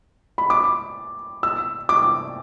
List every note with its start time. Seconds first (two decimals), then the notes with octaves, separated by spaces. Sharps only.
0.38 B5
0.50 D6
1.43 E6
1.89 D6